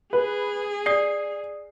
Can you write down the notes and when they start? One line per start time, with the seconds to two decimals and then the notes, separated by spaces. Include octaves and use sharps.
0.13 G#4 B4
0.86 D5 D#6 C7